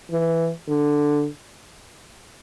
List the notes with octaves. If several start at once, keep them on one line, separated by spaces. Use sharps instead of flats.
E3
D3